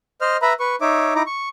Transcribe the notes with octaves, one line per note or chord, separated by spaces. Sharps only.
C5 D#5 F6
B4 E5 A#5 B5
B4 C#6
D#4 C#5 E5 D6
D#4 E4 A#5 D6
C#6